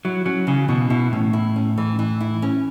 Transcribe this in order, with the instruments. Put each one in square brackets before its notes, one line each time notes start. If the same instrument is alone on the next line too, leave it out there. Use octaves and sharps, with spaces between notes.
[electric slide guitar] F#3 [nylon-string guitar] E4
[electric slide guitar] F#3 [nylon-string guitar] C#4
[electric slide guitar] C#3 [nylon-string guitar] E3
[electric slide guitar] B2 [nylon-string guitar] E3
[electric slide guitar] B2 [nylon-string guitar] E4
[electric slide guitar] A2 [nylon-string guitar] C#4
[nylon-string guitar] E4
C#4
E3
E3
E4
C#4